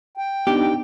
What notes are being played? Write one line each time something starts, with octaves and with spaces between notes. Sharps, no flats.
G5
B3 D4 D#4 G4